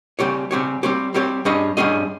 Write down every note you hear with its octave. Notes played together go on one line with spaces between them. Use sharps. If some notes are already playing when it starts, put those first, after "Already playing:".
C#3 G3 C4 G4 C#5
C#3 G3 C4 G4 C#5
G3 C4 G4 C#5
G3 C4 G4 C#5
G2 G3 C#4 G#4 D#5
G2 G3 C#4 G#4 D#5